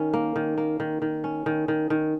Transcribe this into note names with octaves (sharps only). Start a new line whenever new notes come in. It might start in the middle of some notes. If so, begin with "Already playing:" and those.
Already playing: D#3 C#4
A#3
D#3
A#3
D#3
D#3
C#4
D#3
D#3
D#3